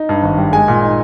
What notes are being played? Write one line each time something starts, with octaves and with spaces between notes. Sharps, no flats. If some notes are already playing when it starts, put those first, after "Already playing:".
Already playing: D#4
G2
G#1
G3
G#3 G#5
A#2
D#4